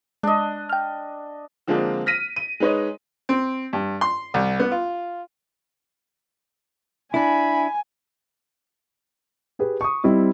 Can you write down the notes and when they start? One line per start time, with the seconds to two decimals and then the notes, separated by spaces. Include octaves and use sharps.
0.23 G#3 D4 D#5
0.69 G5 F6
1.67 D3 F3 G#3 A#3 C4 D4
2.06 F6 A#6 B6 D#7
2.36 D#7
2.60 G#3 D#4 B4 C#5 D#5
3.29 C4
3.73 G2
4.01 C6
4.34 C2
4.60 B3
4.71 F4
7.14 D4 E4 G#5 B5
9.59 G4 G#4 B4
9.81 C#6 D#6
10.04 G3 C4 E4 D#5